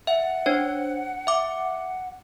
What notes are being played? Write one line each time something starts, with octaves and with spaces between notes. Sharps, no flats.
E5 F#5
D4 C5 C#5
E5 D6